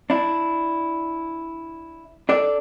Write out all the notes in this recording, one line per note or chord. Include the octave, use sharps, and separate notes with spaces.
D4 E4
D4 A4 D5